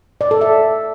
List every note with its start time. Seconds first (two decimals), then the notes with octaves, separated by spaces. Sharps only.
0.21 D5
0.31 A4
0.41 E5